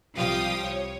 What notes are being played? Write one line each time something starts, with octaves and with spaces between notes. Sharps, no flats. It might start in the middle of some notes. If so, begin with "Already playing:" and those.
C2 F3 G3 F5 G5 D#6
C#5